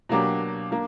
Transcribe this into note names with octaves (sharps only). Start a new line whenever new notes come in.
B2 F#3 A#3 D4 G4
A#3 D4